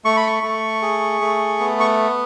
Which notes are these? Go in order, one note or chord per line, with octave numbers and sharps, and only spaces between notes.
A3 C#6
B5
C#6
A3
G#4
A3
B3
C#6